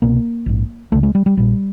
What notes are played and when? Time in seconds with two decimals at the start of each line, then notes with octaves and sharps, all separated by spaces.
0.02 C2 B2 A#3
0.46 A#1 G#2
0.92 C#2 C#3 A3
1.03 G#3
1.15 G3
1.26 G3
1.37 A#1 A#2 G3